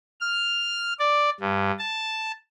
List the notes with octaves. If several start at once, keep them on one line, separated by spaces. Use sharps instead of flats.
F6
D5
G2
A5